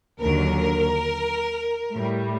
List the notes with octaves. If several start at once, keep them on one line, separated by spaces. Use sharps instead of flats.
D#2 D3 F#3 A#4
A2 G3